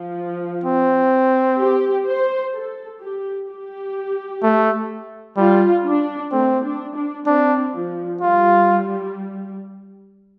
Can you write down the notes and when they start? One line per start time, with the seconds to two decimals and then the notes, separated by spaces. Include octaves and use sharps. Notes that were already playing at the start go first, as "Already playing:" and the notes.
Already playing: F3
0.64 C4
1.59 G4
2.06 C5
2.54 A4
3.00 G4
3.49 G4
4.43 A3
5.37 G3 F4
5.85 D4
6.32 A3 C4
6.64 D4
6.96 D4
7.27 C4 D4
7.74 F3
8.21 G3 F4